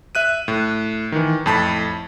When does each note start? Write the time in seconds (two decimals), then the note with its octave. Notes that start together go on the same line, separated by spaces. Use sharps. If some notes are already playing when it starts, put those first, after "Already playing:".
0.15 E5 F#6 D#7
0.48 A2
1.12 D#3 E3
1.46 F2 A2 A5 B5